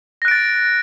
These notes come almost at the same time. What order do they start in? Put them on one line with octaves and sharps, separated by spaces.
A#6 F#6 D7 A6